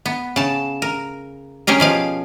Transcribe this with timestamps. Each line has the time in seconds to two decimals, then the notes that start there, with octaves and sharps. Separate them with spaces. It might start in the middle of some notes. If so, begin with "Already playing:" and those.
0.06 B3
0.36 C#3 A5
0.82 A#4
1.67 C#4 G4 G#4 A#4
1.80 B2 F3 F5